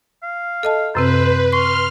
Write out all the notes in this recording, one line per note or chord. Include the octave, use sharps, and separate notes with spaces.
F5
A4 D#5 A5
F#2 C3 C4 B4 C5
C6 C#6 F6